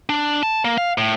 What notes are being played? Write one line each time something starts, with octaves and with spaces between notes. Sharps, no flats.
D4
A5
A#3
F5
A2